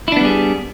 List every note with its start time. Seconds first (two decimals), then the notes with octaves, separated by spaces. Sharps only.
0.08 E4
0.12 D4
0.16 B3
0.21 G3
0.25 G#4